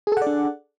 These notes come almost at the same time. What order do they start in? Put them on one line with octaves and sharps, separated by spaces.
G#4 A4 F#5 D5 D4